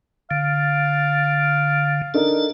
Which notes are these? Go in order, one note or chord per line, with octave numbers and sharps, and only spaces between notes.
D3 F5
D4 D#4 A4 A#4